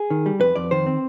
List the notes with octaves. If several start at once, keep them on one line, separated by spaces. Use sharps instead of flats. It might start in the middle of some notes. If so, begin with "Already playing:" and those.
Already playing: G#4
D#3
G3
F2 B4
F2 D5
D#3 C5
C4